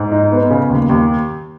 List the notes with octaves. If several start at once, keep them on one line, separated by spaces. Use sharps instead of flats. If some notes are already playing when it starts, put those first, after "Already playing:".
Already playing: G#2
D#4
B3
C#3
D#2
D#2